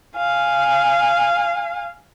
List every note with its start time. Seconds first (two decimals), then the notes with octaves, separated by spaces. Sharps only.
0.16 F5 G#5